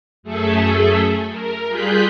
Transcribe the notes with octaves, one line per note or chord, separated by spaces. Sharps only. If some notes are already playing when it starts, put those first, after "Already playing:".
F#2 A3 G#4 A4 E5
A#4
G3 F4 G#4 F#6 G6 B6